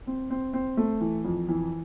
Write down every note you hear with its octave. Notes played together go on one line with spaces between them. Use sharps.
C4
C4
C4
A3
E3
F2
E3